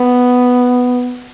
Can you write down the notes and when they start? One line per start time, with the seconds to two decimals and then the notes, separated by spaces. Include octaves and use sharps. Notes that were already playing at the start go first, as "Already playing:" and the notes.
Already playing: B3